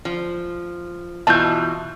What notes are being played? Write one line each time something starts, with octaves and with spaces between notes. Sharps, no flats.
F3
B2 E3 F4 A5 G6